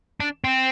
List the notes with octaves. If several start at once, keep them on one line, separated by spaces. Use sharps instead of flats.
D4
C4